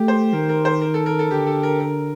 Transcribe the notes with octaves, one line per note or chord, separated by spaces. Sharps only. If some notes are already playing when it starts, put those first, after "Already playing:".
Already playing: A3 G4
C5
D#3 A#4
A#4
C5
A#4
A4
A#4
A4
D3 G4
A4
A#4
A#4